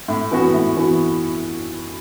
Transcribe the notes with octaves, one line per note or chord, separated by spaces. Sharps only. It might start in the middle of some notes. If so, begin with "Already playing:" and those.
A2
E3 B3 F#4
A2
E3 B3 F#4